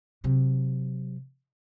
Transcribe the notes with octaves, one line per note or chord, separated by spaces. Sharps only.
C3 F#3